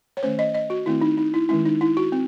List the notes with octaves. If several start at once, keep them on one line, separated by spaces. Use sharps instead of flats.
C#5
D#3 A3 C#4 C5
D#5
D#5
F#4
D#3 A3 C4 E4
D#4
D#4
E4
D#3 G#3 C#4 E4
D#4
E4
F#4
C4